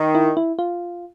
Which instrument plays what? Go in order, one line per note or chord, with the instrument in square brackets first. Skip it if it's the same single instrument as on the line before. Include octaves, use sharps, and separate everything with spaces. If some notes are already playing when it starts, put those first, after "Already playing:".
Already playing: [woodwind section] D#3
[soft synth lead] E4
E4
F4